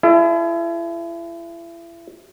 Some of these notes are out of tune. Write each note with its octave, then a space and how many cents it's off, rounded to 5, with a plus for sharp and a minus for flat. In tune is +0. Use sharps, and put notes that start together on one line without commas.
E4 +35 A4 -40 D#5 +0